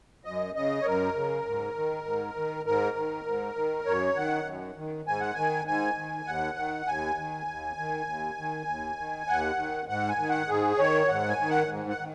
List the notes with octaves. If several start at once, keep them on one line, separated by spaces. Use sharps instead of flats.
F#2 D#5
C#3 D#5
C#5
F#2 A#4
C#3
G#2
D#3
G#2
D#3
G#2 A#4
D#3
G#2
D#3
F#2 C#5
D#3 F#5
F#2
D#3
G#2 G#5
F#5
D#3 G#5
G#2 G#5
D#3
D#2 F#5
D#3
D#2 G#5
D#3
D#2
D#3
D#2
D#3
D#2
D#3
D#2 F#5
D#3
G#2 F#5
G#5
D#3
F#5
G#2 G#4
D#3 C#5
G#2 F#5
G#5
D#3
F#5
G#2
F#5
D#3